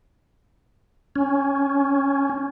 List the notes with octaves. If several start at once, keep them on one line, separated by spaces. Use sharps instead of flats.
C#4